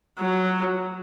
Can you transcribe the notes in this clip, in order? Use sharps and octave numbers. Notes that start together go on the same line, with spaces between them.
F#3